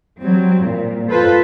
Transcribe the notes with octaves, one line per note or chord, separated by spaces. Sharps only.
F#3 G3 C4
A#2
F4 A4 B4 C5